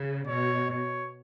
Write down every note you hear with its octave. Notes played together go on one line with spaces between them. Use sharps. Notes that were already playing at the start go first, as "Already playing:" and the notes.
Already playing: C#3
B2 C#5
C#5